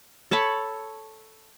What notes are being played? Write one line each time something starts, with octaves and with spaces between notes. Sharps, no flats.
A4 C#5 A5 B5